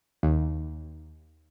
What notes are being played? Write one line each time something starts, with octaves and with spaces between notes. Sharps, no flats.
D#2